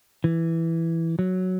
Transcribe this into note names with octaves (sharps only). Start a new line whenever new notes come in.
E3
F#3